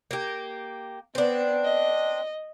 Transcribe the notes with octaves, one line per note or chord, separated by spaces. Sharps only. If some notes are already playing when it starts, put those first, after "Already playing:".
A#3 G4
B3 C4 D4
D#5